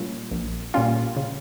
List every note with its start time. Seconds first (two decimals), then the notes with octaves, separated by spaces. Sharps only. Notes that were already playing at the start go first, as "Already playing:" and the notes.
Already playing: A#2 G3 C#4 F4
0.31 A#1
0.74 A#2 G3 C#4 F4
1.17 C#3